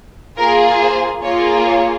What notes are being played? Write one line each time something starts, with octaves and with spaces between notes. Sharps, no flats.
A#3 F4 G#4 A#4
C5
A#3 F4 G#4 C#5
C#5